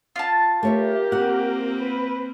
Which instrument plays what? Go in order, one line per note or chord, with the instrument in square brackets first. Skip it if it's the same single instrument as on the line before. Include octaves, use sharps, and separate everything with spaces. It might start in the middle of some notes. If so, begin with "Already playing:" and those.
[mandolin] F4 A5
[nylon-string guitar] A3 C#5 E5 [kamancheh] G4 A#4
[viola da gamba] A#3 C4 [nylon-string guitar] F#4 F#5
[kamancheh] B4